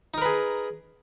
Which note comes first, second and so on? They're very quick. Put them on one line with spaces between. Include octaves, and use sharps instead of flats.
D#4 A#4 B4 G#4